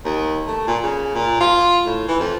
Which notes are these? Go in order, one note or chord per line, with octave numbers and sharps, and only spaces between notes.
D#2
A3
A#2
C#3
A#2
F4
A2
E3
F2